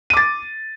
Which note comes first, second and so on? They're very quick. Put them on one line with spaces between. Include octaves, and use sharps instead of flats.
D#7 D6 A6